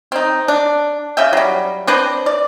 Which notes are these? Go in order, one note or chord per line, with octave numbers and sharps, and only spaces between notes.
C4 D#4
D4
C#3 E5 G5
F#3 G3
C4 D4 B4 C5
D5